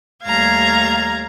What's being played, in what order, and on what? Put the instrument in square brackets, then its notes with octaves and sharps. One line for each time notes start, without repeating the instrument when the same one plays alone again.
[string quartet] D#2 G3 A3 F5 A#5 G#6